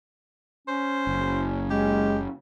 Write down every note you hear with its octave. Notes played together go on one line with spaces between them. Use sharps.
C#4 C5
F#1
G#3 G4